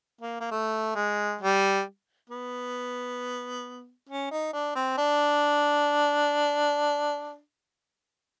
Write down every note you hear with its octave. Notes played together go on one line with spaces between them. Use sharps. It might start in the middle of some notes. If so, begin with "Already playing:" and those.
A#3
A#3
A3
G#3
G3
B3
C#4
D#4
D4
C4
D4